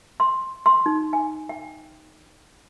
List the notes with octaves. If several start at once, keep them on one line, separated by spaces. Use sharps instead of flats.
C6
C6
D#4
G#5
G5